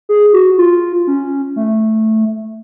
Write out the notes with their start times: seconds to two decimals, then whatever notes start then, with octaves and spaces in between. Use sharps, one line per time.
0.09 G#4
0.33 F#4
0.58 F4
1.07 C#4
1.56 A3